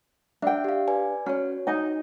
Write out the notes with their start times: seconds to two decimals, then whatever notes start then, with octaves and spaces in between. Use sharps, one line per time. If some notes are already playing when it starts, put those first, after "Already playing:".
0.42 D4 E5 G5
0.64 G4 F5
0.88 B4 D5 G#5
1.26 C#4 F#4 C#5
1.67 D#4 D#5 G#5